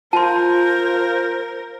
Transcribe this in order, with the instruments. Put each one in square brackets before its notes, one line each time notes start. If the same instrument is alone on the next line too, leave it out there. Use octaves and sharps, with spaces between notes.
[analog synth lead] F4 [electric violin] A#4 [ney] C5 [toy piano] A5 C6